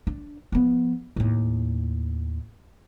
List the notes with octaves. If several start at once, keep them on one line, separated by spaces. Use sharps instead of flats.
D4
F3 B3
D#2 A2